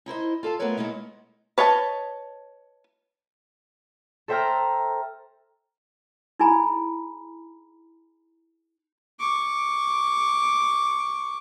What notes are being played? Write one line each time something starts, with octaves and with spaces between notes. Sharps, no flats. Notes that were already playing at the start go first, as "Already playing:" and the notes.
D#4 E4 C5 D#5
F4 A4 F5 A5
A3 B3 F4 A#4 B4 C#5
G#3 A#3 B3 D#4 E4
B4 C#5 D#5 F5 A5
A4 C5 E5 G5 A#5 F6
D#4 E4 G#4 G#5 A#5 B5
C#6 D6